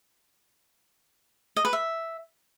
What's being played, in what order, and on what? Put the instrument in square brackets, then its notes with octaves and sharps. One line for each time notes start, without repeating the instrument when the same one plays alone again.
[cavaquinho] D#5
B4
E5